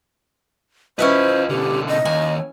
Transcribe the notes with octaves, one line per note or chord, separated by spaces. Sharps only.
C#4 E4 F4 B4 C5 D#5
B2 D3 G4
D#5
D#2 G#5